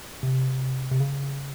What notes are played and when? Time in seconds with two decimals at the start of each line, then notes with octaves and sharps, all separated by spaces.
0.23 C3
0.91 C3
1.00 C#3